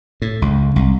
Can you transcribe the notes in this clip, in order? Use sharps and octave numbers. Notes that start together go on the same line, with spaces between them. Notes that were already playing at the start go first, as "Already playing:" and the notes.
A2
C#2
C2